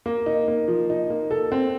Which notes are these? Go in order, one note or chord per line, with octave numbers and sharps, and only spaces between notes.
A#3
D#4
A#3
F3
D#4
A#3
A4
C4